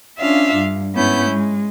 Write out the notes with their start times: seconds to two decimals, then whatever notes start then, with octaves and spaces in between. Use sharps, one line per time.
0.19 C#4 D4 F4 E5 F5
0.55 G2
0.95 G#2 B3 C#4 E4 G6
1.31 G#3